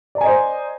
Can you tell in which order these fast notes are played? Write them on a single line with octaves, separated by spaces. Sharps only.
D5 A#5 G#5 D#5 C5